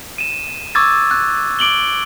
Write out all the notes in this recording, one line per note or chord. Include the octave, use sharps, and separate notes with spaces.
D#7 E7
C#6 D6 E6 G#6 A6
F#6
D6 D7 F#7 G7